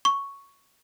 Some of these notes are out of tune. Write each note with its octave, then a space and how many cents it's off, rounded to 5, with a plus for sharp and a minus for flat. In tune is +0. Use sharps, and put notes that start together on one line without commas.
C#6 +5